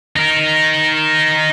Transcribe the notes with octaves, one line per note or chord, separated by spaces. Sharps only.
D#4 A#4